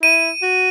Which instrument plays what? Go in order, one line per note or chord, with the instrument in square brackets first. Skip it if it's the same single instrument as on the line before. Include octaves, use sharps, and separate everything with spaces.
[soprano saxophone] E4 [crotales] D#7
[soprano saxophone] F#4